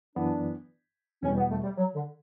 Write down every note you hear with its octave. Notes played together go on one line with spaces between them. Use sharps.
F#2 E3 B3 D4
E2 B2 G3 C#4
B3
A3
G3
F#3
D3